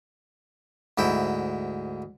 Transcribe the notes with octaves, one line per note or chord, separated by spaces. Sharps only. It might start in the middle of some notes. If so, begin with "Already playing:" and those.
D2 G#2 E4 G5